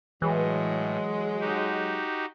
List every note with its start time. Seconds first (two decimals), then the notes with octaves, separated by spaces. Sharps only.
0.22 A2 E3 F#3 G#3
1.41 D#4 F#4 G4